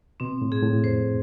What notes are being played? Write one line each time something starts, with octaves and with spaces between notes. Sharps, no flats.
B2 C4
A2
G#4
A2
F2 C5